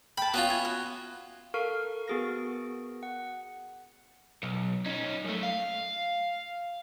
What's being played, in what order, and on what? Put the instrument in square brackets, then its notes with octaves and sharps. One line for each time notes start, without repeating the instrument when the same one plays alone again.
[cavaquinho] G5 A5 [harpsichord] B5
[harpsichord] B3 C#4 F4 [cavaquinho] F#4
[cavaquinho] E5 G#5
F#4
[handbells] A4 A#4 F5 C#6 F6
B3 F#4 G#4 A#4 A#6
F#5
[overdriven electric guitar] B1
C#4 D#4
F#2 A3
F5